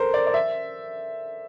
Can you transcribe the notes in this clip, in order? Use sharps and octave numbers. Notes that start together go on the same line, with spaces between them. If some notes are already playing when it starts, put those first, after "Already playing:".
Already playing: A4 A#4 C5
D5
D5
E5